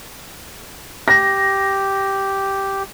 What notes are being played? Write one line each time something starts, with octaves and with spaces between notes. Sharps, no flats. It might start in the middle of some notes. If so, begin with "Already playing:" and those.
G4 A#6